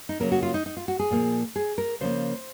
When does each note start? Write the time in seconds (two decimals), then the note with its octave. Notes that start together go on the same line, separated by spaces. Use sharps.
0.09 D#4
0.20 C#3 F#3 A#3 A#4
0.32 F#4
0.43 F4
0.54 D#4
0.66 D#4
0.77 F4
0.88 F#4
0.99 G#4
1.11 A#2 F3 A#3
1.56 G#4
1.78 A#4
2.01 C#3 F3 A#3 C5